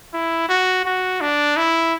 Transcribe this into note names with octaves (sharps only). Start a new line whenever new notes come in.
E4
F#4
F#4
D4
E4